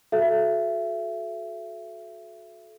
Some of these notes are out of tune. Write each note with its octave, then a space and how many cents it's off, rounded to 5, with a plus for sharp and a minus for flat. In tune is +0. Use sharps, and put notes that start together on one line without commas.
F#4 -20 A4 -25 E5 +25